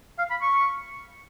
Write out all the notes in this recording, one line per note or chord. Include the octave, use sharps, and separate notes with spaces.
F5
B5
C#6